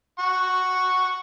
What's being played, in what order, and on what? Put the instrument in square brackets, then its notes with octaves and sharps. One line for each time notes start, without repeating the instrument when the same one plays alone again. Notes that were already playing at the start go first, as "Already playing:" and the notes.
[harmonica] F#5 C#6